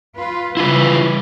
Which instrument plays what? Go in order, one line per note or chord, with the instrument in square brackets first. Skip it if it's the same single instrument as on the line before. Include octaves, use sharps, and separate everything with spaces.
[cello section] F4 B4
[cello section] C#3 E3 G3 [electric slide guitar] E4 F4 B4